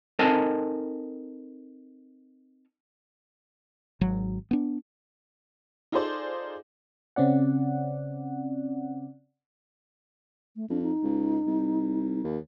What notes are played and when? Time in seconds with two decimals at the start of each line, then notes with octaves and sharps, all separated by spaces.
0.19 C4 D#4 A4 A#4 G#5 A5
4.01 G#1 F#3
4.51 B3 D4
5.92 D#4 F4 G#4 A4 C5 D5
7.16 C#3 C4 C#4 D5 F#5
10.56 A3
10.70 F2 D4
10.82 D#4
11.03 C#2
11.46 C2
12.24 D#2